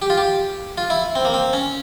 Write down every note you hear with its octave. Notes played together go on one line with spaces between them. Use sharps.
G4
F4
G4
F4
E4
C4
A#3
C4
C#4